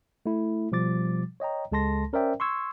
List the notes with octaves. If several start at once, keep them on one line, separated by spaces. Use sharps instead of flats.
A3 E4
B2 F3 G3 D6 A6
C#5 D#5 G5 A#5
C#2 G#3 A4 A5 C6 A#6
C#4 A#4 C5 D5 E5 G5
C6 C#6 E6 G#6